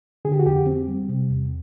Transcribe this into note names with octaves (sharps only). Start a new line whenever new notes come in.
D3 G#4
G4
F#4
F2 G4
C4
G3
C3
E2